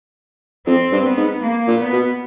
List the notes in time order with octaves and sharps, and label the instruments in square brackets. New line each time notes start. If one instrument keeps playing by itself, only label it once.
[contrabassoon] F2 [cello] C4
[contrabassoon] G2
[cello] B3
[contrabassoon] G#2
[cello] A#3
[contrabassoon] A#2
[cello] B3
[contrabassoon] B2